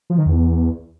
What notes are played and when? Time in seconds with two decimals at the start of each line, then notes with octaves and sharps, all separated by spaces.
0.10 F3
0.18 D#3
0.26 E2